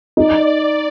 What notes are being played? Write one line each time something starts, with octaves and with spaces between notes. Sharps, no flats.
D#4 D5